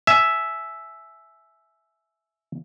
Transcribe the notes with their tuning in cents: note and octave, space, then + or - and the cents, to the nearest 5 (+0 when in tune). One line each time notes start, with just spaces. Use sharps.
E5 +0 G#5 +25